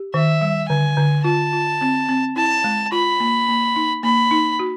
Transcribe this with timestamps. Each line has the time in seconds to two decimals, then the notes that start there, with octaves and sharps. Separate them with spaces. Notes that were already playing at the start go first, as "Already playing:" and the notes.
Already playing: G4
0.14 D#3 E5
0.41 G3
0.69 D3 G#5
0.97 D3
1.24 F4 A5
1.53 F4
1.81 C4
2.09 C4
2.36 E4 A5
2.64 G#3
2.92 F4 B5
3.20 A#3
3.48 A#3
3.76 D#4
4.03 A#3 B5
4.31 D#4
4.59 F#4